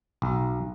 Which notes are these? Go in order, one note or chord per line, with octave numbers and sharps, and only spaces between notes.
B1